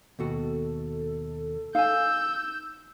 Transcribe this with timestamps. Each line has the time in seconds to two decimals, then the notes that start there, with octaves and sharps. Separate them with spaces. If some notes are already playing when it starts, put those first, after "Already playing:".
0.19 D#2 B2 F#4 A4
1.75 D#4 F5 G#5 E6 G6